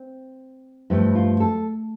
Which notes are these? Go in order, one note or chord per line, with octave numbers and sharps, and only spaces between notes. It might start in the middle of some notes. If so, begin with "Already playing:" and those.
Already playing: C4
G2 F3 A3 E4
F4
A4